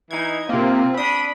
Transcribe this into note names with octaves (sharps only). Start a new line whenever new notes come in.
E3 D#4 G#6
C3 A#3 C4 F4
D4 B5 D#6